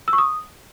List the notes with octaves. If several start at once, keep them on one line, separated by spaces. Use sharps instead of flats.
E6
C#6
D#6